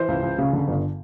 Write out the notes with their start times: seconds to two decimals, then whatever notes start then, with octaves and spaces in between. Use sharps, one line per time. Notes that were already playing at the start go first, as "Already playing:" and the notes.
Already playing: E3 C5
0.08 C#2
0.22 C#2
0.38 C#3
0.53 D3
0.68 G1